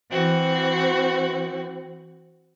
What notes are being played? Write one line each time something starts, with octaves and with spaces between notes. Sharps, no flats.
E3 C4 F#4